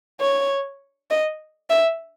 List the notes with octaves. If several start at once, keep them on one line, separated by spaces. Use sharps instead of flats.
C#5
D#5
E5